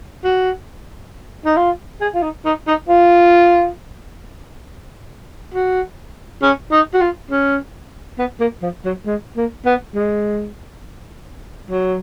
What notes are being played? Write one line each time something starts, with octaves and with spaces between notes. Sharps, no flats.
F#4
D#4
F4
G#4
F4
D#4
D#4
D#4
F4
F#4
C#4
D#4
F#4
F4
C#4
B3
A#3
F3
F#3
G#3
A#3
B3
G#3
F#3